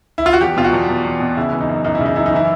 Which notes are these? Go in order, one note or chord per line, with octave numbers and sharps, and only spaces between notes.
E4
F4
F#4
E2 G4
B2 F4
F#4
E2
E2
E2
B2
C#3 E4
E3
D#4
F#2
F#2 D#4
E4
C#3 D#4
F#2 E4
D#4
E3 E4